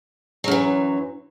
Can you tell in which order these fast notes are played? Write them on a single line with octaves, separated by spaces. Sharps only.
F#3 F#2 E3